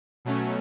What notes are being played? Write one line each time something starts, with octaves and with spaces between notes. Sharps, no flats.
B2 F#3 A3 C#4